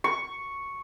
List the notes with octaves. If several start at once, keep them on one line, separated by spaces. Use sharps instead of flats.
C#6